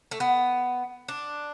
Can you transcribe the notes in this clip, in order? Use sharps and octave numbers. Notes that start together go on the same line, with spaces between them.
A3
B3
D4